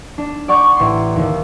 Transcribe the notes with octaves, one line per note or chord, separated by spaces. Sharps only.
D4
D5 F#5 C#6 D6 G6
A1 C6
D#2 D#3